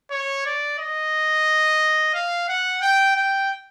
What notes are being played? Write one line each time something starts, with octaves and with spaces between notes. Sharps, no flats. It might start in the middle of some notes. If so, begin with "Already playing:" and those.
C#5
D5
D#5
F5
F#5
G5
G5